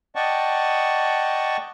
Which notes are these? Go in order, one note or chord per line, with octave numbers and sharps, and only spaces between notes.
D5 D#5 F#5 G5 A5 C#6